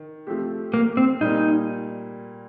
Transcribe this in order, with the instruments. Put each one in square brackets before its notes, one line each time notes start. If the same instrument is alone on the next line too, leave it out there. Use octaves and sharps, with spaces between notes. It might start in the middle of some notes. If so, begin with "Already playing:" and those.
Already playing: [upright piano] D#3
F3 A3 C4 G4
[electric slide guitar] A#3
C4
[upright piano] A#2 G3 A#3 [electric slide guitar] D#4